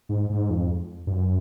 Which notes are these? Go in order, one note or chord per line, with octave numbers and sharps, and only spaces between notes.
G#2
G#2
F2
G2
F#2